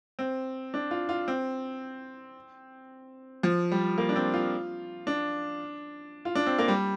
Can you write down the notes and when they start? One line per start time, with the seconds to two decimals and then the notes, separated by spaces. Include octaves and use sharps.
0.19 C4
0.74 D4
0.91 F4
1.09 F4
1.28 C4
3.43 F3
3.72 G3
3.98 A#3
4.09 D4
4.16 C4
4.34 F4
5.07 D4
6.25 F4
6.35 D4
6.46 C4
6.58 A#3
6.68 G3